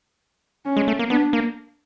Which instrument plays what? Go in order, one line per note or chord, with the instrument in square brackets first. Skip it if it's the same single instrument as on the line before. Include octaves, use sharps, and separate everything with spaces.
[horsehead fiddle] C#4
[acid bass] G#3
A3
A#3
[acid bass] B3 [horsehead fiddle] D4
[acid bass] A#3